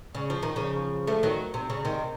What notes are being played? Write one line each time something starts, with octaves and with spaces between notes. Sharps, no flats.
C#3
F3
D#3
C#3 F3
F3 A3
D#3 F#3
C3
C#3
C3 D#3